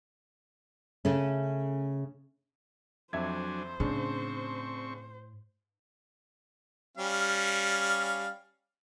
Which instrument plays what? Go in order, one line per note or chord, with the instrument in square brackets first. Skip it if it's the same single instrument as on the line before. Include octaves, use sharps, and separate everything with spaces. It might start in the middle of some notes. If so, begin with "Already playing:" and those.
[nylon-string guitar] C#3 A3 C#4
[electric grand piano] F2 E5 G#6 [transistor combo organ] F#3 D4 G#5 [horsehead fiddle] C5
[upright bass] A2 [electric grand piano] C#3 D4 [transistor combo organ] C4 C#6
[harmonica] G3 C#4 F5